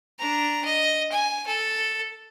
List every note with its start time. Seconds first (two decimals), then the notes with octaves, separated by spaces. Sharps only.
0.19 D4 A#5
0.65 D#5
1.12 G#5
1.47 A4